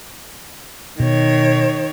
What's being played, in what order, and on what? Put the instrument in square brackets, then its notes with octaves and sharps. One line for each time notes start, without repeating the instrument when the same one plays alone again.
[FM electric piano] B2 [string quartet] D#3 C#5